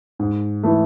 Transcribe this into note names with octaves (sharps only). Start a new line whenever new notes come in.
G#2
E3 A3